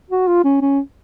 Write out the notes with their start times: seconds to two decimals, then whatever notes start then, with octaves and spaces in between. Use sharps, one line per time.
0.10 F#4
0.27 F4
0.44 C#4
0.61 C#4